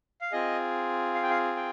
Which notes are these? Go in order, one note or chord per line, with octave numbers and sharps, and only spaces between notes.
F5
C4 F4 G#4 D#5
F5
G5
F5
G5